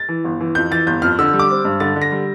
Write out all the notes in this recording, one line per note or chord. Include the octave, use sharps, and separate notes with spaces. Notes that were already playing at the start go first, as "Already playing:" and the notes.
Already playing: A6
E3
G1
E3
F2 G6
E3 A6
G1 G6
F2 F6
D3 E6
G3
D6
C4
G2
D3 A6
D3
A#6
G3